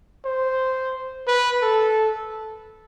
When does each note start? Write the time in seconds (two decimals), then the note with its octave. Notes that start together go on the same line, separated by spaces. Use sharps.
0.25 C5
1.27 B4
1.62 A4